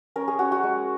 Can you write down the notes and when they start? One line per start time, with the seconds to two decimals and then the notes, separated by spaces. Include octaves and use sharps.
0.16 C#4 A#4
0.28 G#4
0.39 C#4 F#4
0.52 F#4
0.63 G#3